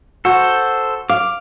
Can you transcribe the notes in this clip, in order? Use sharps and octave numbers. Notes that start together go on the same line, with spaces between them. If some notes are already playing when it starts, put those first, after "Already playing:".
F#4 A4 C5
F5 D6